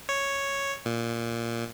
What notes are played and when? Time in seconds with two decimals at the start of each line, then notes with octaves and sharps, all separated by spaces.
0.09 C#5
0.86 A#2